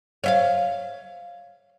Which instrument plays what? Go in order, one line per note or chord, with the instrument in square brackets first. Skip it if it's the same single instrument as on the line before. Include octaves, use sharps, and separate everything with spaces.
[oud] C#5 E5 F5